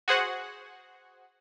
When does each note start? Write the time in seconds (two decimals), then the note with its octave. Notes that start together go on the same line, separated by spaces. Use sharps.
0.08 F#4 G#4 C5 F#5